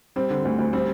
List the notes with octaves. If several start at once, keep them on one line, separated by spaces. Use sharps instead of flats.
G3 C4
D3
D2
D2
G3 C4